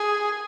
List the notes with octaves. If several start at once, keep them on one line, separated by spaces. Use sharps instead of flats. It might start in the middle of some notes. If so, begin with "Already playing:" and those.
Already playing: G#4